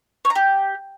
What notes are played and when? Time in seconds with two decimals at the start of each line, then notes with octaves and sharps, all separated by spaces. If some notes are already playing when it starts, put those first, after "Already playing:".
0.25 C#5
0.30 A#5
0.35 G4